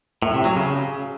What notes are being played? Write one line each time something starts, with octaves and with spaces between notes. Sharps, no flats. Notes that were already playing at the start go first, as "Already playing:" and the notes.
A2
C3
F#3
C#3